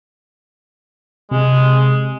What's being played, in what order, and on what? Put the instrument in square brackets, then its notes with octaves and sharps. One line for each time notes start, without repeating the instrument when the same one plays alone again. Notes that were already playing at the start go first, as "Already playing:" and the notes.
[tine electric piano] C3 [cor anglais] G#3